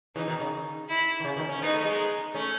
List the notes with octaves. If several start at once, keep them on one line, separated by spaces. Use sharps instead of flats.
C#3 E3 D#4
B2 D#3
C#3
E4
D#3
C#3
B2 D#3
C#4
B3 D#4
A3
G#3 B3
A3 C#4